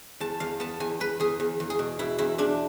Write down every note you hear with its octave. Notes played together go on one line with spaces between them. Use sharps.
E2 A5
E2 F5
B3 A5
E2 G#5
E2 B4
E2 G#4
E2
E2
G#4
B2
B2 E4
E2 E4
E2 D4